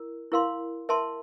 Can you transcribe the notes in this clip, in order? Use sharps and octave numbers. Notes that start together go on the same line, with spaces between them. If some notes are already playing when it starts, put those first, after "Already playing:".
Already playing: E4 A#4
E4 A#4 F5 C6
A#4 E5 A5 C6